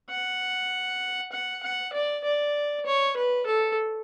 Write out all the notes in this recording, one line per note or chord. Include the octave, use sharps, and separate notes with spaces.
F#5
F#5
F#5
D5
D5
C#5
B4
A4